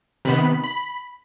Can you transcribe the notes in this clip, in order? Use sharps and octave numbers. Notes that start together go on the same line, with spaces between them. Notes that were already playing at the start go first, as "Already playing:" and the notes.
C3 D#3 B3 B5
B5